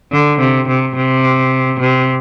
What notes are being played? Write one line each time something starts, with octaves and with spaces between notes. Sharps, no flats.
D3
C3
C3
C3
C3